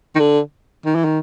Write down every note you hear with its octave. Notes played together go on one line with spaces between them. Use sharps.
D#3
D3
D#3
E3
D#3